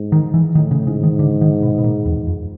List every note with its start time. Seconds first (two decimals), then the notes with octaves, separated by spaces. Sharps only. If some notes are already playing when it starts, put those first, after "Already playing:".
Already playing: G#2
0.12 D#3
0.34 E3
0.55 A2 D#3
0.71 C#3
0.87 G#2 C#3
1.03 D#3
1.19 D3
1.41 D#3
1.63 B2
1.78 B2
1.84 A#2
2.06 E2
2.27 F2